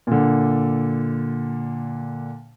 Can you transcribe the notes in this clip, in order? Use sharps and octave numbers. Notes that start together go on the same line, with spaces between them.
A#2 D3